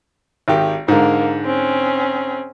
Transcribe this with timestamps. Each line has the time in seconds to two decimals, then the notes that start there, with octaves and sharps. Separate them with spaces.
0.48 G#1 D#3 G4
0.88 G#2 D3 A#3
1.45 C4 C#4